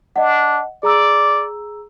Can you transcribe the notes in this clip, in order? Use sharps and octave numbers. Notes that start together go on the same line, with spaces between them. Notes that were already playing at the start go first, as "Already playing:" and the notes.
D4 D#5 F#5
G#4 D5 A#5 E6